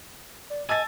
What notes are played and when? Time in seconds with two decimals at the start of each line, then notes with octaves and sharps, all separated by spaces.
0.50 D5
0.69 D#5 G#5 A5 E6 A6